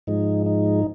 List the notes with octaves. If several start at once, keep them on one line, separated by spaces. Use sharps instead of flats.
G#2 F3 G#3 D#4
D#4